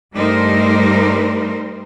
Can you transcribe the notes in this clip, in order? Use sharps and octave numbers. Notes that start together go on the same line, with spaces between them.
G2 G3 A3 D#4 A#4 C5